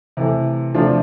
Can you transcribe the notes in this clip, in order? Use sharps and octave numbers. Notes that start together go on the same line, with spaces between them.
C3 E3 A3
C3 F3 A3 D4 F4